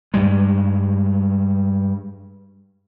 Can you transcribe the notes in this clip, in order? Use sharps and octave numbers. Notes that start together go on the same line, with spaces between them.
G2 G3 G#3